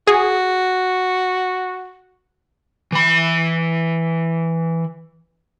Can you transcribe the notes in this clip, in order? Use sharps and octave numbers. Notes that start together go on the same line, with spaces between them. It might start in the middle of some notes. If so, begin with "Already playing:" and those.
F#4 G#4
E3 B5